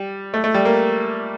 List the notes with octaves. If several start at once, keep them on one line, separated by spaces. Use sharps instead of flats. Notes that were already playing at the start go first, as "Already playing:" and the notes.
Already playing: G3
A3
A3
G3
A#3